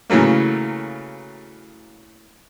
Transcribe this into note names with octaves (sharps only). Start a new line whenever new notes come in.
C#3 E3 F#3 A3 A#3